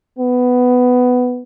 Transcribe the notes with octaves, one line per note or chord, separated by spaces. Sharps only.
B3